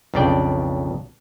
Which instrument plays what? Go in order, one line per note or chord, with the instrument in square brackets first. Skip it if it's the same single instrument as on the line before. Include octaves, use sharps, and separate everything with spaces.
[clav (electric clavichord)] B1 F2 C#3 D4 D5 G5